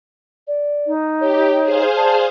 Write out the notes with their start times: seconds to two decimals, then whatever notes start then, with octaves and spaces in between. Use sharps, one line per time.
0.47 D5
0.87 D#4
1.20 G4 C#5
1.62 G#4 C5 F5
1.97 D5 A5